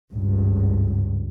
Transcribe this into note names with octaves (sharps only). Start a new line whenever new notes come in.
G#1 C#2 G2